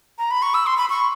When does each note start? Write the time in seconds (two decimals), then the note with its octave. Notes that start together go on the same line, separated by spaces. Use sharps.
0.18 A#5
0.31 B5
0.42 C#6
0.54 E6
0.67 C6
0.77 B5
0.90 C#6